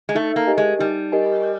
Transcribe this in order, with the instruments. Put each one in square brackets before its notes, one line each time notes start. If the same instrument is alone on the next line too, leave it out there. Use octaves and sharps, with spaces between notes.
[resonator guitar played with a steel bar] G#3
[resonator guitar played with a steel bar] A3 [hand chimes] D#4
[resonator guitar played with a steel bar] A#3
[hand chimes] G4 A#4 D#5 G#5
[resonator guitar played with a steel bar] G#3
[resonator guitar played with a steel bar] G3 [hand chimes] D#4
[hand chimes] G4 A#4 D#5 G#5